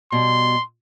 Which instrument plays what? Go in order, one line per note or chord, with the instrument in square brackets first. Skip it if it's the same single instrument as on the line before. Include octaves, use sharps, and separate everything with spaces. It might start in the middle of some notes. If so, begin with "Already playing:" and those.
[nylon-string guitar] B2 G3 [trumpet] C6